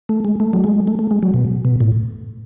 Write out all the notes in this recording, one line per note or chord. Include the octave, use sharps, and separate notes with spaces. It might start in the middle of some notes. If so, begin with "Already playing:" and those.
A3
G#3
A3
F#3
G#3
A3
A3
G#3
F#3
B2
B2
A2